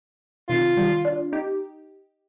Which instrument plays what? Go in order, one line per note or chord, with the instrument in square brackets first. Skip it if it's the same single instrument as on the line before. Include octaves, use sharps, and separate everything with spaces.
[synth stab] C3 D#3 [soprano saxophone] F4
[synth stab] D#3 G3
D4 F4
D#4 G4